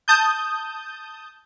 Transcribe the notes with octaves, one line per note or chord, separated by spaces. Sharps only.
A5 D#6 G6